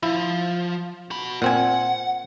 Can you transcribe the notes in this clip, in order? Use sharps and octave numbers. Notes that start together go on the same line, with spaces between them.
F3 E4
F#4 B5
A#2 C4 F#5 G#5